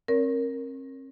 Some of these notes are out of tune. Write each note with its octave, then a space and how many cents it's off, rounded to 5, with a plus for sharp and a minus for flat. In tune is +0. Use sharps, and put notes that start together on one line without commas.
C4 +45 A#4 +0 C#5 +40